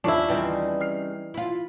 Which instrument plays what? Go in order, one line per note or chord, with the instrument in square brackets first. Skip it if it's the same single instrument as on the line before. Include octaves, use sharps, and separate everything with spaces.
[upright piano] D#2 D#3 F3 [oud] C#4 [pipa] D4 E4
[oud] C#3 G3 C4 [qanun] E3 D#4
[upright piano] F6 C7
[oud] E4 F4 [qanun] B5